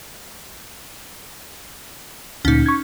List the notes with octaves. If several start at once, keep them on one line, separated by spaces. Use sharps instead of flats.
D2 A#2 C#4 D#4
C#6 G#6